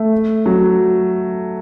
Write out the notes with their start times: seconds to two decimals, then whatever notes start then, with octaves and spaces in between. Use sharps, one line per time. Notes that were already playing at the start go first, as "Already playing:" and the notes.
Already playing: A3
0.46 F#3